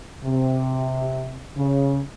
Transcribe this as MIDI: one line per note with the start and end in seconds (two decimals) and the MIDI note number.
0.24 1.42 48
1.57 1.99 49